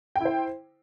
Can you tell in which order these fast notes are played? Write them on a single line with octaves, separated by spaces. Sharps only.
G5 E4 C5